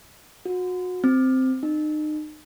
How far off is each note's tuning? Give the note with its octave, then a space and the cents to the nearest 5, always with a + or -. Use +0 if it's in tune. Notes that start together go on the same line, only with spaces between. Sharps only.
F#4 -30
C4 -5
D#4 -35